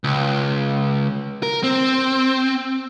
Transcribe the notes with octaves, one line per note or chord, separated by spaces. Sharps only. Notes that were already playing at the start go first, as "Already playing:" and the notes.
C#2
A#4
C4